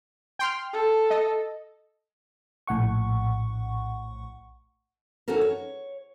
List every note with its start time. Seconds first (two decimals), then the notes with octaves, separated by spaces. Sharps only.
0.39 G5 C6 F6
0.73 A4
1.10 D#5
2.67 A#1 A2 F#5 C#6
5.28 C#4 D#4 E4 F#4 A4 A#4
5.41 C#5